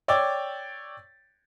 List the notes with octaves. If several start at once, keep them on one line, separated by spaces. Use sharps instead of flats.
C#5 D5 G5 D6 E6 A6